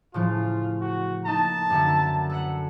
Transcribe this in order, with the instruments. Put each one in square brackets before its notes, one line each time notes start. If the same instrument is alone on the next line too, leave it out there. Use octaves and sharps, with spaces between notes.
[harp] A2 C#3 F3 [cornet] F4
[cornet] F#4
[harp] A#3 D#4 [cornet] A5
[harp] F#2 D3 E5
A4 B4 F#5